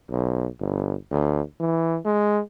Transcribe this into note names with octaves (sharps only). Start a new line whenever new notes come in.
B1
G1
D2
E3
G#3